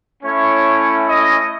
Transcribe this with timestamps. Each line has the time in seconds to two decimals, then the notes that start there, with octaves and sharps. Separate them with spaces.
0.23 A3 C#4 E4 C#5
1.05 D#5